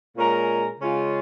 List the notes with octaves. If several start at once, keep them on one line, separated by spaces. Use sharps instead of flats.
A#2 G#3 C#4 A#4
C#3 G#3 C#4 F4